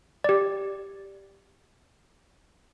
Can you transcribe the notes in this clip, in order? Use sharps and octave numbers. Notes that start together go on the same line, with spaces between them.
G4 D5